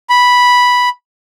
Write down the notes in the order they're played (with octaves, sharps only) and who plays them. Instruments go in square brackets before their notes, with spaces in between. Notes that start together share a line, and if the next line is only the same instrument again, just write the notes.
[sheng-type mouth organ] B5